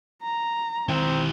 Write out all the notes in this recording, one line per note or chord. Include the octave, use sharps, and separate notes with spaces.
A#5
D#3 C4 E4 G4